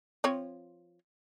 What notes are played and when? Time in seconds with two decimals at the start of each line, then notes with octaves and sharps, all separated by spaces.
0.24 F3 C4 C#5